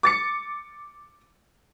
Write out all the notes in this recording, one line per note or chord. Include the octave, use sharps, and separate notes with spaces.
D6 A6 C#7